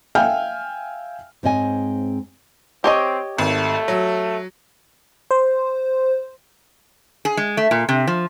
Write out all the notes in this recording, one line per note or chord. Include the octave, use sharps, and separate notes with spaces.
E5 F5 G5 G#5 F6 G6
G#2 C4 C#5 D#5 G#5
C4 G4 C#5 D#5
G#1 A3
F#3
C5
G#4
G#3
A3
A#2
C3
F3